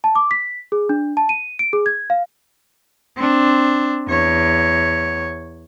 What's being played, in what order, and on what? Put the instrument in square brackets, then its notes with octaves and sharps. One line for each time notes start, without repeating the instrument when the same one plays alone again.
[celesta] A5
D6
B6
G#4
D4
A5
D#7
D7
G#4
G#6
F5
[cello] C4 D4
E2 C#5